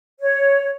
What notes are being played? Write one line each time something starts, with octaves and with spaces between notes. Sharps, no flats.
C#5